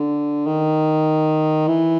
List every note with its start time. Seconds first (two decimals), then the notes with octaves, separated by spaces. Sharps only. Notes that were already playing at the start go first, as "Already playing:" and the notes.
Already playing: D3
0.47 D#3
1.68 E3